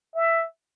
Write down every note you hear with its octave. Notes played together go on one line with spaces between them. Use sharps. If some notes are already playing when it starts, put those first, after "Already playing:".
E5